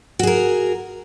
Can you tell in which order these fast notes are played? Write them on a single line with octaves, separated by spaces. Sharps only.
F#4 G#4 A#4